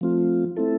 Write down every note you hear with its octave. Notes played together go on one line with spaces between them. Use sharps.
F3 A3 C4 F4
A3 C4 E4 A4